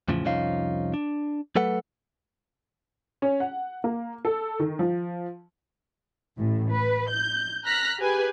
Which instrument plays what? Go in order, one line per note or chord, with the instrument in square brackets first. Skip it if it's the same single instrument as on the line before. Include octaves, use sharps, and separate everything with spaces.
[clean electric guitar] E2 A2 C#3 F3
C2 F2 F3 C#4 D#4 F5
D4
F#3 A3 A4 B4 F#5
[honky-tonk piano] C#4
F#5
A#3
A4
D#3
F3
[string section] A1 A2
B4
G6
A#5 F6 F#6 A#6 B6
G4 G#4 B4 G#5